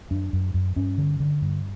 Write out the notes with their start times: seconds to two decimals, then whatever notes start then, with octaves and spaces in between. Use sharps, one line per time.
0.11 F#2 D4
0.33 F#2
0.54 F#2
0.76 G2 C#4
0.98 D3
1.20 D3
1.42 G2